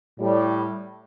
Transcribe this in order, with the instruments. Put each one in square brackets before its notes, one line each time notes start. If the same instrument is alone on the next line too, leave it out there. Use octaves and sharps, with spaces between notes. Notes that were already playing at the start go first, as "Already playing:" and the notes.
[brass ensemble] A2 G3